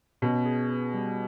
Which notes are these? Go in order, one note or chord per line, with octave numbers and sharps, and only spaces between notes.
B2 C#4
G#4
B4
G3